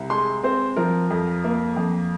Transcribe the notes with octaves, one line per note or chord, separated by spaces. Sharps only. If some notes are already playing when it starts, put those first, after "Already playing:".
Already playing: C2
G#3 C6
C4 C5
F3 A#4
F2
A#3
F2